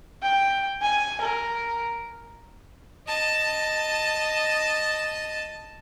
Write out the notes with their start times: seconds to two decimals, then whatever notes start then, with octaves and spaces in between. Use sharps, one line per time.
0.22 G5
0.82 G#5
1.21 A#4
3.07 D#5 A5